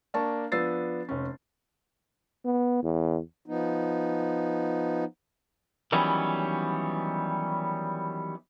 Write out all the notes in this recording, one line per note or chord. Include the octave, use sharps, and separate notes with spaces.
A#3 D4 A5 C#6
F3 B3 D4 E6 A6 C7
F1 C#4
B3
E2
F3 B3 D#4
D#3 E3 F#3 G3 B3 C#4